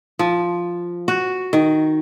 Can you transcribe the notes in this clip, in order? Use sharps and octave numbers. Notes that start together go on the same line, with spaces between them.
F3
F#4
D#3